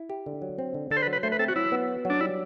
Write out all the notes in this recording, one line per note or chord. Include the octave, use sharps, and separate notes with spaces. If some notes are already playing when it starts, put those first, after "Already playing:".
Already playing: E4
G4
D3
F#3
C4
D3
D3 A4
C5
B4
F#3
B4
A3 C5
B4
C4 A4
F#4
F#3 E4
B3
F#4
F#3 D4
G3 E4